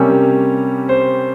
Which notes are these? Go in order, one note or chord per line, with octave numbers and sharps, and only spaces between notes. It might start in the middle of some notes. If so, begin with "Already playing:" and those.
Already playing: C3 G3 A#3 C#4 C#5
C5